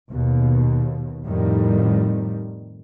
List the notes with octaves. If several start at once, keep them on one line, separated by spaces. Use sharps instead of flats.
D#2 B2
F2 A2 D#3 G3